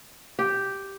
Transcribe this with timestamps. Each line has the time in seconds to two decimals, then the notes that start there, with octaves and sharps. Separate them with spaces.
0.39 G4